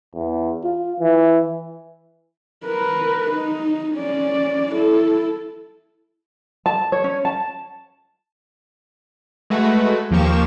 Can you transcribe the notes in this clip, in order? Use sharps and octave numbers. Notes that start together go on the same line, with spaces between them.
E2
F4
E3
A#4 B4
D#4
C#4 D5
E4 A4
A5
C#5
C#4
A5
G#3 A3 F#4 B4
D#2 F3 A#3 G4 C#6 E7